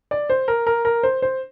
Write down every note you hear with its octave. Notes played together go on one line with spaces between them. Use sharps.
D5
C5
A#4
A#4
A#4
C5
C5